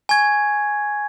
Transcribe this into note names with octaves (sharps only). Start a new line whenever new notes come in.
G#5 C#6 G#6